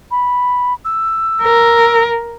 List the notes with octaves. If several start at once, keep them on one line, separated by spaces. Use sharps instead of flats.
B5
E6
A#4